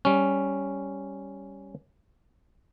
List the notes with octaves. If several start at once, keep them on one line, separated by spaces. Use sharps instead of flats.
G3 C#4